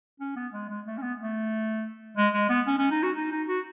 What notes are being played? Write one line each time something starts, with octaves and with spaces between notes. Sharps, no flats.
C#4
B3
G#3
G#3
A3
C#4
B3
A3
G#3
G#3
B3
C#4
C#4
D#4
F#4
D#4
D#4
F#4